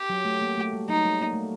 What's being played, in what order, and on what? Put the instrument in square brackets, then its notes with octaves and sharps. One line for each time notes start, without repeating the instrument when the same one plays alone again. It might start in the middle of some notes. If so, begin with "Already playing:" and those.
Already playing: [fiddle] G4
[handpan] F#3
A3
A#3
A3
G3
[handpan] F#3 [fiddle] D#4
[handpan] G3
A#3
A3